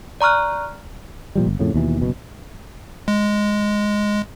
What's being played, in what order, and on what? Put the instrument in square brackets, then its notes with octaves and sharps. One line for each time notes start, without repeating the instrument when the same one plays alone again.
[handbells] D5 A#5 C#6 F6 F#6
[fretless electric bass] A#2 F3 G3
G1
F2 A2 C#3
D#2 B2 E3
F#1 B2
[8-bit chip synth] G#3